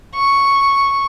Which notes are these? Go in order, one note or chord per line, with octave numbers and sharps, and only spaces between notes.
C#6